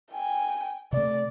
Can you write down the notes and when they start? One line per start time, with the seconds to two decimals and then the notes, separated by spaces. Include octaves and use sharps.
0.13 G5 G#5
0.93 C3 A3 D5